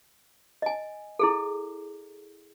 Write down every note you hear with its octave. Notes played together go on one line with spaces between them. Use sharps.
D#5 G#5
E4 G#4 A4